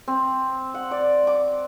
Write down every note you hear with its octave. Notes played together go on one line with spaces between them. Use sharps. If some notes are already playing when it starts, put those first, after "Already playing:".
C4
F#5
D5
D6